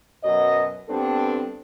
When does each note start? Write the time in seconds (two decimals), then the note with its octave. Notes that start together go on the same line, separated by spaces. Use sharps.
0.24 F#2 B2 F#3 D#5
0.88 G2 B3 C4 D4 A4